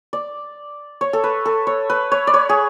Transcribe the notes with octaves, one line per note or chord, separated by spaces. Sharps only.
D5
C#5
A4
B4
A4
C#5
B4
C#5
D5
C#5
G#4